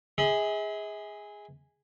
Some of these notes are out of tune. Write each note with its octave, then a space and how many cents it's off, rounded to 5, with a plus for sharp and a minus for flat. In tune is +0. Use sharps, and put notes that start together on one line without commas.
G#4 -10 E5 -45 B5 +35